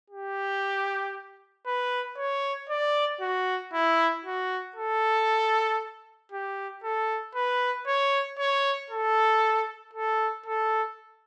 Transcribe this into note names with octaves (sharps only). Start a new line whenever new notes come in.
G4
B4
C#5
D5
F#4
E4
F#4
A4
G4
A4
B4
C#5
C#5
A4
A4
A4